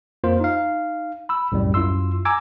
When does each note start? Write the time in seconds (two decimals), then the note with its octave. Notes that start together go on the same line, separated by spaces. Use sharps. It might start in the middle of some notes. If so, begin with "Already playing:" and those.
0.24 F2 A#3 F4 C5
0.40 D#4 F5
1.29 B5 E6
1.52 C2 F#2 A2 G3
1.74 F#2 E4 F4 C6 E6
2.25 G#5 A#5 D6 E6 G#6